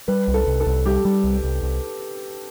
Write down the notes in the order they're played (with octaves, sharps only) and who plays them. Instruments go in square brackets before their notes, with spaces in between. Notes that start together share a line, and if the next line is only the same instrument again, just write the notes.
[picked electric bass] G3 [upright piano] B4
[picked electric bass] C2
[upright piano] A4
[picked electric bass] C2
[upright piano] A4
[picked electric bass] C2
[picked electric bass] G3 [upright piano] G4
[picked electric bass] G3
C2
C2
C2